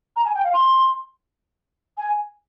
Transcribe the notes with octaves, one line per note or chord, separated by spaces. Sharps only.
A#5
G#5
G5
F5
C6
G#5